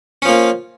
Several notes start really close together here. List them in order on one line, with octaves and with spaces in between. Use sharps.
C#4 F3 A#3